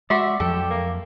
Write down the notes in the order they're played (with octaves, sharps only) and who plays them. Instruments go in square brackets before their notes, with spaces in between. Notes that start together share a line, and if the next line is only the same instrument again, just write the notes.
[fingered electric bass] G#3 [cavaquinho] F#4 C6 [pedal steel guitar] D5 [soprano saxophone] E5
[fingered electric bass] F2 F3 F#3 [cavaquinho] A4 [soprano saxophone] G5
[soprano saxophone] A#3